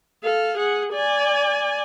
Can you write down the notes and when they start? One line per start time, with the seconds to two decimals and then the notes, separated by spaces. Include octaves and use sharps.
0.24 A4 F5
0.57 G#4 F#5
0.93 D5 G#5